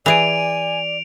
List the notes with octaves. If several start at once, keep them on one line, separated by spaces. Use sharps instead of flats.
E3 G#4 D5 G#5 D7 F7